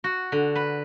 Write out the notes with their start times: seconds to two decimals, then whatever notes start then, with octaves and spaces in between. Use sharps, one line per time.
0.04 F#4
0.32 D3
0.55 B4